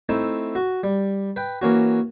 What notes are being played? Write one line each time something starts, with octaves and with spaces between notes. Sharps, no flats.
A3 C4 D#4 E4
F#4
G3
B4 G5
E3 A#3 C#4 F#4